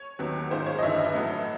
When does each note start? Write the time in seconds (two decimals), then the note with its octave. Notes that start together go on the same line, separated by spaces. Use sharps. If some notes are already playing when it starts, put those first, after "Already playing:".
Already playing: C#5
0.19 D#2 D#3 F#3 B3
0.51 G#2 D#3 G#3 C#4 F4 C5
0.66 C#5
0.78 D#5
0.83 G1 G2 E3 E5
0.98 D#5
1.14 A2 F#3 A3